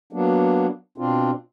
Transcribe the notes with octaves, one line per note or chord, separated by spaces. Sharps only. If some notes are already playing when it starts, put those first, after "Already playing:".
F#3 A#3 B3 D4
B2 C4 D4 F4